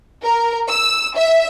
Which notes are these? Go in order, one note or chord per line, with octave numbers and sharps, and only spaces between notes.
A#4
E6
E5